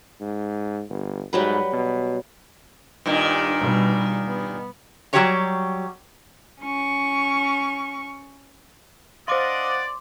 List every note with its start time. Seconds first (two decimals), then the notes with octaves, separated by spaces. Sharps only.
0.21 G#2
0.89 G1
1.33 G#2 F#3 G3 B4
1.73 B2
3.06 G2 A#2 D#3
3.60 B2 G3
4.28 B3
5.13 F#3 G3 F#4 G4 C#5 A#5
6.61 C#4 C#6
9.28 D4 C5 D5 D#5 F5 F#5 C6 D6